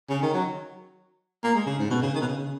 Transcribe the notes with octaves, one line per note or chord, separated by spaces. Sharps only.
C#3
D#3
F#3
A#3
G#3
C#3
G#2
B2
C#3
D#3
B2
C#3
C#3